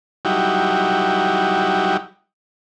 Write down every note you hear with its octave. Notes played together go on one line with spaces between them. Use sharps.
F#3 G3 D#4 E4 F#4 G4